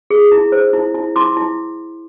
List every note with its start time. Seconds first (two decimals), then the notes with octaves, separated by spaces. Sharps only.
0.10 G#4
0.32 E4
0.52 C5
0.73 E4
0.95 E4
1.16 E4 C6 D6
1.37 E4